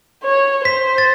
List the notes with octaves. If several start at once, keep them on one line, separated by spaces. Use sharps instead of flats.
C#5
C5 B6
A6